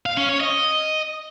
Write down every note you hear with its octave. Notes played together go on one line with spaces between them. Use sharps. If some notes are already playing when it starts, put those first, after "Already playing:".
F5
C#4
C#5
D#5